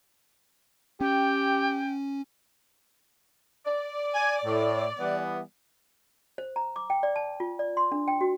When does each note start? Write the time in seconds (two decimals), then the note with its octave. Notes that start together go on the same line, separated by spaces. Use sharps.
1.01 C#4 G4 G5
3.66 D5
4.14 G#5
4.44 A2
4.99 E3 G3 B3
6.38 C5
6.56 A#5
6.76 D6
6.90 G5
7.03 D5
7.16 A5
7.40 F4
7.59 D5
7.77 C6
7.92 D4
8.08 G5
8.21 F#4